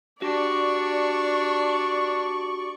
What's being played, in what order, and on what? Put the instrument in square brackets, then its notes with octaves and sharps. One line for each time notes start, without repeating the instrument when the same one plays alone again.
[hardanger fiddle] D4 [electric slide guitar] F#4 G4 [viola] D5 C#6